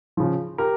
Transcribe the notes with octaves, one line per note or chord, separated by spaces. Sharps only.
C#3 F3
G4 A#4